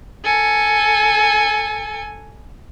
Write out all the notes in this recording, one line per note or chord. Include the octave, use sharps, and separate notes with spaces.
A4 G#5